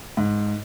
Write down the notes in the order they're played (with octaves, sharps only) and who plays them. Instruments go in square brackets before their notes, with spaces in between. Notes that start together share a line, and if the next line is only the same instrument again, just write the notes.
[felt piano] G#2